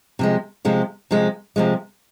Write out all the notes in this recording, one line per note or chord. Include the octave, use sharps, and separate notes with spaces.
C3 F3 G#3
C3 F3 G#3
C3 F3 G#3
C3 F3 G#3